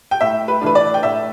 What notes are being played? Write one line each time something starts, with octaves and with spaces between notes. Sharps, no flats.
G5
A2 E5
B4
E3 A3 D4 B4
D5
G5
A2 E5